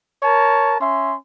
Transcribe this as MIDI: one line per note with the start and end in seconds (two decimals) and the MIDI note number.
0.23 0.78 70
0.23 0.78 73
0.23 0.78 81
0.80 1.15 61
0.80 1.15 76
0.80 1.15 84